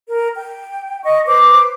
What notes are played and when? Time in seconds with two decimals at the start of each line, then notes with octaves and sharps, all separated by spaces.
0.07 A#4
0.35 G5
1.04 D#5 C#6
1.26 B4 C5 D6